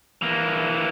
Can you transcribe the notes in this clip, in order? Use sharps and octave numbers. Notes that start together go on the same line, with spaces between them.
E3 A#3